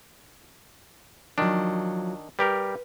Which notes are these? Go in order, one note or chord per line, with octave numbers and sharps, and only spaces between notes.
D#3 F3 F#3 D4
G3 G4 A#4 B4